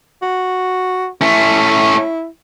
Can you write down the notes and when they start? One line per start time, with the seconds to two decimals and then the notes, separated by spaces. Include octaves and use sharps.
0.22 F#4
1.21 A3 C#4 E4